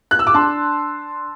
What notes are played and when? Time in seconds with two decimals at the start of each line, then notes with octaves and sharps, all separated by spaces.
0.11 F#6
0.19 E6
0.27 D6
0.34 D4 A5 C6